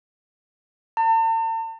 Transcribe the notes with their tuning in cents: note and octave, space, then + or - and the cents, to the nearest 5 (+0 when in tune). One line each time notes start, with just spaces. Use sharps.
A5 +45